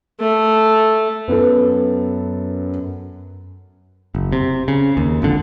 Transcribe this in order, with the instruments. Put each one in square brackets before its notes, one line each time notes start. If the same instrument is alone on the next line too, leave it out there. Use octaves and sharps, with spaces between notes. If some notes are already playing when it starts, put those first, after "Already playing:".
[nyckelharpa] A3
[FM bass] F#2 [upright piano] B3 A4
[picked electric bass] F#1
C3
C#3
D#2
G#1 F2 D3